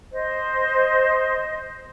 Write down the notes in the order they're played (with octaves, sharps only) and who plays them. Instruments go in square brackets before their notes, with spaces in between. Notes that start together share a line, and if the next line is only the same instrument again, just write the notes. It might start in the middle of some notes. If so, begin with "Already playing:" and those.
[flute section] C5 D#5